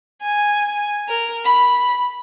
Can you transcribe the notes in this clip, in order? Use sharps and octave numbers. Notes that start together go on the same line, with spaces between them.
G#5
A#4
B5